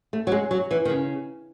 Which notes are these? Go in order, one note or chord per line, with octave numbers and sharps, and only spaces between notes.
A3
F#3
G#3
F#3
E3
D#3
C#3